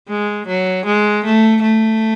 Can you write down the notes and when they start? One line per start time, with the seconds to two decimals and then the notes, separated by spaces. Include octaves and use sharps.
0.09 G#3
0.47 F#3
0.86 G#3
1.25 A3
1.62 A3